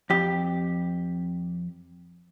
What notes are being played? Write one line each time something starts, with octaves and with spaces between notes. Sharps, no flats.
F2 G4